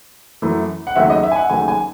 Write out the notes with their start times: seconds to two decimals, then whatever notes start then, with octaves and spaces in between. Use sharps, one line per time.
0.42 F#2 E3 A3
0.87 F#5
0.96 D#2 C#3 F#3 A3 E5
1.10 D#5
1.23 E5
1.32 G#5
1.36 F#5
1.50 D#2 C#3 F#3 A3 G#5
1.68 G#5